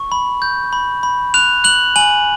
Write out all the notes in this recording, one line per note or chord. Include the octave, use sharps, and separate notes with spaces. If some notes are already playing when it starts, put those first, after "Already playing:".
Already playing: C#6
B5
G6
B5
B5
F#6 F7
F#6 F#7
G#5 F#7